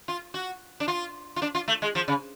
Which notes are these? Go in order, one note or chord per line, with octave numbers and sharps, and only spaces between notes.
F4
F#4
D4
F4
F4
D4
F4
A3
G#3
F3
C#3